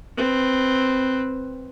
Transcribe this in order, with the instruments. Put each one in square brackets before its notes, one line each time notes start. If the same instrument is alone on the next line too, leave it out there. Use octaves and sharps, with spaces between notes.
[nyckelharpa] C4 B4